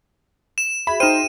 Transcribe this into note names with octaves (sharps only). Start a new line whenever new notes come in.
E7
F#4 G#4 E5 B5
D#4 C5 G5 F6 D#7 E7